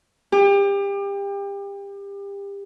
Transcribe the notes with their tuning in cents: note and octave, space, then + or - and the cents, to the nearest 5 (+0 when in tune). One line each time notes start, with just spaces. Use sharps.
G4 +30